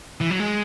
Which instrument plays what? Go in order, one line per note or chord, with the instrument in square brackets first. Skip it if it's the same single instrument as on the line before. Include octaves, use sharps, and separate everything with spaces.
[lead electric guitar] E3
F#3
G#3